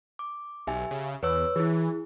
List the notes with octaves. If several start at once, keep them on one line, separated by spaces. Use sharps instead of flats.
D6
B1 G4 E5 G#5
C#3
E2 B4 C#5 E6
E3 E4 G#4